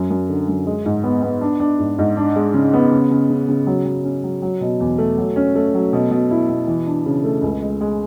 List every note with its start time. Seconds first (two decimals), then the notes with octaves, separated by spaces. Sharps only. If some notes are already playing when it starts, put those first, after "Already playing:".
Already playing: F#2
0.10 F#2
0.29 D3
0.48 F#2
0.67 G#3
0.85 G#2
1.03 B3
1.22 B3
1.41 D4
1.60 D4
1.79 G#2
1.98 G#2
2.17 D4
2.36 G#3
2.54 C#3
2.73 B3
2.91 C#3
3.11 C#3
3.30 C#3
3.48 C#3
3.67 F#3
3.85 F#3
4.04 C#4
4.24 F#3
4.42 F#3
4.61 B2
4.80 E2
4.98 A3
5.18 F#3
5.36 C#4
5.55 A3
5.74 F#3
5.93 B2
6.11 B2
6.31 E4
6.49 B2
6.67 E3
6.86 D4
7.06 C#3
7.24 A3
7.42 C#2
7.62 G#3
7.81 G#3